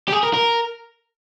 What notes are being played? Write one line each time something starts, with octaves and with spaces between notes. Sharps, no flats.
G4
G#4
A#4
A#4